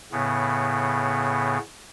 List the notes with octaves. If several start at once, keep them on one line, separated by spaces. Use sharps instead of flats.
A2 C#3 B3